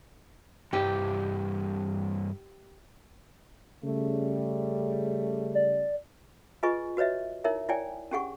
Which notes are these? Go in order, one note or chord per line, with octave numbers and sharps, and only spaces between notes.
C2 G2 G4
C#3 G3 A3
D5
F4 G#4 B4 D#5 G#5 C#6
F#4 B4 C#5 D#5 E5
D#4 E4 A#4 C#5 E5
E4 C#5 D5 G5 G#5
C#4 D4 G4 G#4 F#5 C#6